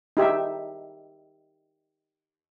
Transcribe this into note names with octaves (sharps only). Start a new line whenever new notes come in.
D#4 G4 E5